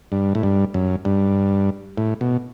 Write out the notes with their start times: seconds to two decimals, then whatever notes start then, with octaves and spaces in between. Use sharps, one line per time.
0.12 G2
0.35 A2
0.43 G2
0.74 F#2
1.05 G2
1.98 A2
2.21 B2